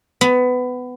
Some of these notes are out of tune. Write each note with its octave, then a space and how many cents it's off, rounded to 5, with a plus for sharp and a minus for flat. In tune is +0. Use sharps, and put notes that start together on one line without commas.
B3 +20